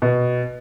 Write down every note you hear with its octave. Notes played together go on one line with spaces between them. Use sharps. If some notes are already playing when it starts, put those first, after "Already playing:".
B2